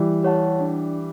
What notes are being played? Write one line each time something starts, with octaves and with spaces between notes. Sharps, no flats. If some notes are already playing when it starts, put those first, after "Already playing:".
Already playing: E3 G3
G4 C#5 F#5 A5
D4